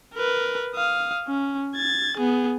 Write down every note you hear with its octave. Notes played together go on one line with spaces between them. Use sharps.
A#4 B4
F5 D#6
C#4
G#6 A6
B3 G#4